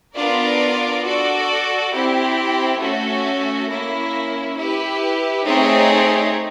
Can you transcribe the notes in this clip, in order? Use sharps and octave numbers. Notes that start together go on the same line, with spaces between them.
B3 D4 F4 A#4 D5
F#4 A4 D5
C4 E4 G4
A3 C#4 F#4 A4
A#3 C#4 E4
E4 G4 B4
A3 C4 D#4 G#4 C#5